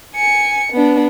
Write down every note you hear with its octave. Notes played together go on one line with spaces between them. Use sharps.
G#5 C#7
B3 D4